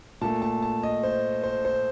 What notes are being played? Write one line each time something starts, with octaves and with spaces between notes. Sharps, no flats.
A#2 A3 A5
A5
A5
D#5
C5
C5
C5